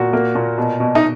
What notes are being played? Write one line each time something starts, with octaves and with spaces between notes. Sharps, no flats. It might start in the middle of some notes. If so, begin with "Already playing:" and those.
Already playing: A#2 F#4
A#3
A#2
B2
B2
D#4